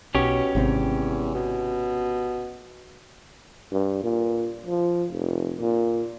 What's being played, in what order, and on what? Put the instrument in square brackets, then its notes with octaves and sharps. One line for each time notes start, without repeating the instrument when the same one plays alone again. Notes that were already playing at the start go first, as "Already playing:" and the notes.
[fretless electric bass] B1 [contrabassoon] B2 [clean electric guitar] C#4 G4 C#5
[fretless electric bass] G#1 C3 C4 [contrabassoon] E2
[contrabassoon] B2
[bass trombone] G2
A#2
F3
F1
A#2